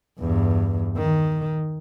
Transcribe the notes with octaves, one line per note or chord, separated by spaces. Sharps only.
E2 G2
D#3